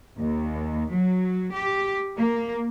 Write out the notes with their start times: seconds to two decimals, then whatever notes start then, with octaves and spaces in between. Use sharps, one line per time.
0.17 D#2
0.91 F#3
1.53 G4
2.16 A#3